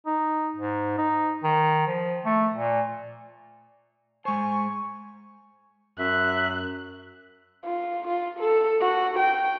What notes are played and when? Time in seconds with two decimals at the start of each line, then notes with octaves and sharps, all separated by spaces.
0.06 D#4
0.56 G#2
0.98 D#4
1.43 D#3
1.87 F3
2.25 A3
2.54 A#2
4.25 G#3 C5 G#5 C#6
5.99 F#2 E5 F#6
7.65 F4
8.08 F4
8.39 A4
8.81 F#4
9.19 G5